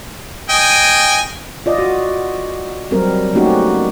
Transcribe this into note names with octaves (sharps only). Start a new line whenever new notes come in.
D#5 G5 G#5
F4 D5 D#5
F#4
F#3 G3 C4 A#4
A3 A#3 C#4 D#4 F#4 G4